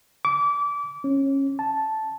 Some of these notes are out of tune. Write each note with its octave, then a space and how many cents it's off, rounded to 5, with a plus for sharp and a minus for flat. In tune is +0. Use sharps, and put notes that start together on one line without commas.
D6 -25
C#4 -20
A5 -5